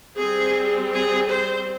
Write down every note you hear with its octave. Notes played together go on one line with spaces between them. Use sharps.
G3 C4 G#4
G#4
C5